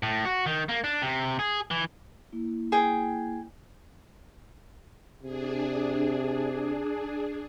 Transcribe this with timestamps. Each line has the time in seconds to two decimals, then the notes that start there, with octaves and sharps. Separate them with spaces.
0.03 A2
0.25 F#4
0.46 D#3
0.69 A#3
0.84 D4
1.02 C3
1.39 G#4
1.71 E3
2.32 A#3 E4
2.72 G#4 G5
5.23 C3 D4 G#4